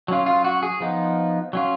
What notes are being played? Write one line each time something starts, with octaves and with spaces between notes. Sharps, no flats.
F#3 C#4 F4
F4
F#4
G#4
F3 B3 D#4
F#3 C#4 F4